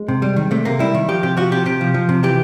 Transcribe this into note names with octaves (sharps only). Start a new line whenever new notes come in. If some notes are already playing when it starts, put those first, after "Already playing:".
Already playing: G#3
C3
G3
D#3
C3 A3
C3 A#3
G3 E4
D#3
F3 G4
C3 G4
F3 F#4
C3 G4
C3 G4
F3
F3
C3
E3 G4